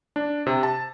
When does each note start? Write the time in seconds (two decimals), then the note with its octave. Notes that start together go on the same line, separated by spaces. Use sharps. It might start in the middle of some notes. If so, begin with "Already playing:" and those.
0.16 D4
0.46 C3
0.63 A5